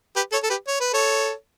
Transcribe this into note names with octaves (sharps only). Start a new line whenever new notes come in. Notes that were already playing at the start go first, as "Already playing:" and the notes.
G4 B4
A4 C#5
A4
G4 B4
C#5
B4
A4 C#5